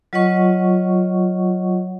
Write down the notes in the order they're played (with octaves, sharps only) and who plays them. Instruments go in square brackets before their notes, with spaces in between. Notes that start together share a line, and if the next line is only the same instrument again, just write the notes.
[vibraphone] F#3 F4 C#5 D#5 F#5 C#6